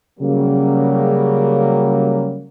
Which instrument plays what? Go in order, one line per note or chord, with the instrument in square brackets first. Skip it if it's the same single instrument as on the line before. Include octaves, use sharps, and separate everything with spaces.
[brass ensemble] C#3 F#3 G3 A#3